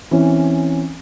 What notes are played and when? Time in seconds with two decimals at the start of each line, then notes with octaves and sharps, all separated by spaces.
0.11 E3 C4 C#4